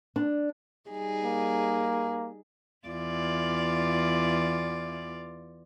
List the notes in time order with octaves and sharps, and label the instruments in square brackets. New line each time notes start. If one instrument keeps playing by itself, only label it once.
[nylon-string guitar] D4
[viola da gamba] G3 D#4 G#4
[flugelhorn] A#3
[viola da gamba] E2 F4 D5